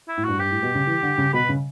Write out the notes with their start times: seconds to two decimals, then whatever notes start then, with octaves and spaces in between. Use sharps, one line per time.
0.08 E4
0.17 A2
0.24 G2 F#4
0.39 G2 G4
0.51 A2
0.63 B2
0.75 C#3
0.87 E3
1.03 D3
1.18 C#3
1.34 B2 B4
1.49 C#3